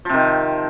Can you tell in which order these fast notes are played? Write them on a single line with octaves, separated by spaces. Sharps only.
F3 C3 D#3